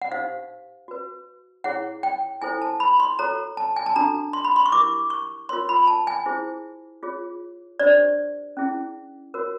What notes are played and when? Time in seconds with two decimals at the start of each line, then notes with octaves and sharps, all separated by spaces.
0.02 F#5
0.11 D#4 G4 C5 F5
0.88 F#4 B4
1.64 E4 G#4 C#5 F#5
2.03 G5
2.42 E4 A4 C5 G#5
2.62 A5
2.80 B5
3.00 C6
3.19 F#4 A4 C#5 A#5
3.57 A5
3.76 G#5
3.86 A5
3.96 D4 F#4 A4 A#5
4.33 C6
4.44 B5
4.56 C6
4.66 C#6
4.72 E4 G4 A#4 D6
5.10 C#6
5.49 F4 A#4 C#5 C6
5.69 B5
5.87 A5
6.07 G#5
6.26 E4 G#4 C5
7.03 F4 G#4 C#5
7.80 D4 G4 C5 D5
8.57 C#4 E4 G#4
9.34 F#4 A#4 C#5